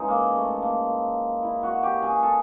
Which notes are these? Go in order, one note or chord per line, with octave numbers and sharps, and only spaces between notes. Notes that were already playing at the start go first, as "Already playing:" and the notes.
Already playing: C#3 E3 G#3 D#4
A#3
A3
A#3
E4
F#4
G4
G#4
A4